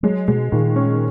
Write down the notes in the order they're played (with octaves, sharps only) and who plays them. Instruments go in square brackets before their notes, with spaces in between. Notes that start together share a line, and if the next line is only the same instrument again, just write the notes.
[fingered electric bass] F#3 [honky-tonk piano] G#3
[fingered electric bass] B2 [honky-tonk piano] G#3
[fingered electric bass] A#2 [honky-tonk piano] D#3
[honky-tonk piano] C#4